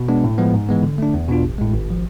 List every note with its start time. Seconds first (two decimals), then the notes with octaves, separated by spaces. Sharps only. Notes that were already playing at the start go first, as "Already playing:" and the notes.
Already playing: B2
0.08 G#3 B3 D4
0.24 A2
0.38 F3 G#3 B3
0.54 G#2
0.69 E3 G#3 B3
0.83 D3
0.98 A3 D4
1.14 E2
1.29 B2 B3 D4 F4
1.43 A1
1.58 A2 G#3
1.73 G#1
1.91 F3